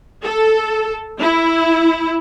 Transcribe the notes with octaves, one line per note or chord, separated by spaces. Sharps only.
A4
E4